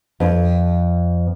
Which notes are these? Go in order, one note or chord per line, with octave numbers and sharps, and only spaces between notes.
F2